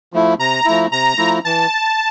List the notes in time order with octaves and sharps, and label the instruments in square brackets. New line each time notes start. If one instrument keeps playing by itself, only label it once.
[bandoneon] F3 A3 E4
[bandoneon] C3 [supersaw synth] A#5
[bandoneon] F3 A3 E4
[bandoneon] C3 [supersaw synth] A#5
[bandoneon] F3 A3 E4
[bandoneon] E3 [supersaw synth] A5